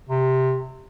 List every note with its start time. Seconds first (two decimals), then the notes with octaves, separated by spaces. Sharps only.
0.09 C3